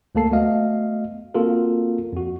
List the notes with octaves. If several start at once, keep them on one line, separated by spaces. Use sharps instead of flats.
D2 A3 A#3 A4 A5 C7
A3 B3 F#4 D#5 F5
A#3 C4 F4 F#4 A4 A#4
F2 F#4